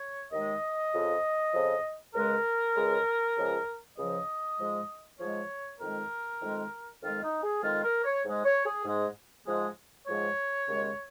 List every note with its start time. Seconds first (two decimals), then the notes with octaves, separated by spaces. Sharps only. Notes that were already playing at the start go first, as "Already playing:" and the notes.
Already playing: C#5
0.31 D#2 D#3 G#3 D#5
0.93 F2 C#3 F3
1.53 F2 C#3 F3
2.14 C#2 C#3 G#3 A#4
2.76 C#2 C#3 G#3
3.36 C#2 C#3 F3
3.98 C#2 C#3 F3 D#5
4.59 G#2 F3 G#3
5.20 G#2 F3 G#3 C#5
5.80 F2 D#3 G#3 A#4
6.42 F2 D#3 G#3
7.02 F2 D#3 G#3 F4
7.22 D#4
7.43 G#4
7.63 F2 D#3 G#3 F4
7.83 A#4
8.04 C#5
8.24 G#2 G#3
8.45 C#5
8.65 G#4
8.85 G#2 G#3
9.46 G#2 F3 G#3
10.07 G#2 F3 G#3 C#5
10.69 D#2 C#3 G#3